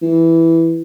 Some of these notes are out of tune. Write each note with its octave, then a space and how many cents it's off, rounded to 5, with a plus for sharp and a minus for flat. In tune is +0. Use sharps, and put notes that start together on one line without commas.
E3 +0